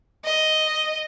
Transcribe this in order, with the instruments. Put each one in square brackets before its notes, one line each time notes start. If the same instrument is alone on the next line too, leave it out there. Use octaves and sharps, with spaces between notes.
[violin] D#5